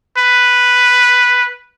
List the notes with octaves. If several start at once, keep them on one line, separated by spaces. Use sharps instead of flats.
B4